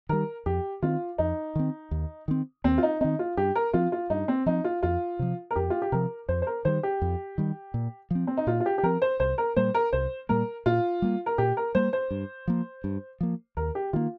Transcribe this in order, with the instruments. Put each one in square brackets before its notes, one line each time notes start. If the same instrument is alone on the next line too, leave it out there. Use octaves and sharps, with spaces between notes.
[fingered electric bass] D#3 G3 [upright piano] A#4
[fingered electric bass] F2 [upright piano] G4
[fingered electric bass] D#3 C4 [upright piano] F4
[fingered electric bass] F2 [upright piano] D#4
[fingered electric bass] D#3 C4
D#2
D#3 C4
[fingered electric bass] D#2 [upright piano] C4
[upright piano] F4
D#4
[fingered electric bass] D#3 C4 [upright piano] D#4
[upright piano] F4
[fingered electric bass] G2 [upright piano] G4
[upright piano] A#4
[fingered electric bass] F3 C4 [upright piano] F4
[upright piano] F4
[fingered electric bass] G2 [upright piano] D#4
[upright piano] C4
[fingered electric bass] F3 C4 [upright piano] D#4
[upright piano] F4
[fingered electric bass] F2 [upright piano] F4
[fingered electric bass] C3 F3
[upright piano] A#4
[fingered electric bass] F2 [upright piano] G4
[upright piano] F4
G4
[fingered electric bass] C3 F3 [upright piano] A#4
[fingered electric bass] F2 [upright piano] C5
[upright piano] C5
A#4
[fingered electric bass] D#3 G3 [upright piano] C5
[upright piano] G4
[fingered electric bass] F2
D#3 G3
A#2
F3 C4
[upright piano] C4
D#4
[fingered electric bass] A#2 [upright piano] F4
[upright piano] F4
G4
G4
[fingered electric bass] F3 C4 [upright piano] A#4
[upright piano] C5
[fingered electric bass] C2 [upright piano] C5
[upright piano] A#4
[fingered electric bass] A#2 G3 A#3 [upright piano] C5
[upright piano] A#4
[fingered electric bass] C2 [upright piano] C5
[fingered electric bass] A#2 G3 A#3 [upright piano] A#4
[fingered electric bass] A#2 [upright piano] F4
[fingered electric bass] G3 A#3
[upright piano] A#4
[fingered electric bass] A#2 [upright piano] G4
[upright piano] A#4
[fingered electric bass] G3 A#3 [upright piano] C5
[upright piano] C5
[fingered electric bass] G2
F3 A#3
G2
F3 A#3
[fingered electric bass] D#2 [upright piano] A#4
[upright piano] G4
[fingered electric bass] D#3 A#3 [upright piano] F4